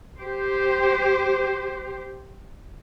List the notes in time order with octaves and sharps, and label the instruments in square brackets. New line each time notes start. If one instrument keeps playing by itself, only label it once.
[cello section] G4 C5